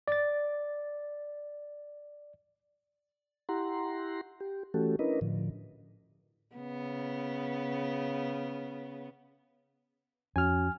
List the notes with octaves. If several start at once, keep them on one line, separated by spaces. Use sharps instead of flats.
D5 A6
E4 G4 F#5 A#5 C6
G4
E3 A3 C#4 F#4 G4 A4
C#4 D4 E4 A#4 B4 D#5
A2 D3 F3
C#3 B3
F2 C#4 F#4 G#5 F6